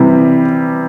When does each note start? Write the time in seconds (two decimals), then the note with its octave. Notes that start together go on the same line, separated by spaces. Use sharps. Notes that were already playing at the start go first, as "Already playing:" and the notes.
Already playing: C3 E3 G3